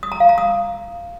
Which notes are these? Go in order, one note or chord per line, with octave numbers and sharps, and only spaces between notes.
D#6
A#5
F5
A#5
D#6